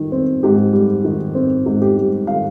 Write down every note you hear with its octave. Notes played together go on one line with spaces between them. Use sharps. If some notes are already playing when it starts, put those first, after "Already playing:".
Already playing: D#3 G3
C4
G#2 G4
G3
D#3
C4
G#2
G4
G3
D#3 F5